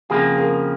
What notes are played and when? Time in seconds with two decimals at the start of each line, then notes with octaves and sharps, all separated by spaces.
0.10 F2 C#3 F3 A#3 F#4 G#4
0.38 G#4 A#4